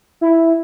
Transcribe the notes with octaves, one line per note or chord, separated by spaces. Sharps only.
E4